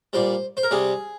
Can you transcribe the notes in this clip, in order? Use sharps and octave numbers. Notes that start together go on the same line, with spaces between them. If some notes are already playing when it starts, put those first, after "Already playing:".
A#2 G3 C5
C5
A#4
C3 G3 G#4